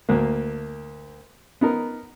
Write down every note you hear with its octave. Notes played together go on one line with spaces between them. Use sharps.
D2 A#3
B3 D#4 A#4